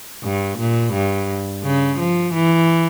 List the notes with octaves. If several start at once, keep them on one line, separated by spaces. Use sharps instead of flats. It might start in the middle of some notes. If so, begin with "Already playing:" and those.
G2
A#2
G2
C#3
F3
E3